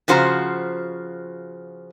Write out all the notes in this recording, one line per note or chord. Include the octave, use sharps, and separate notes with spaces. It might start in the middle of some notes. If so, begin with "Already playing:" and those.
C#3 F3 F#4 C5 A5 A#5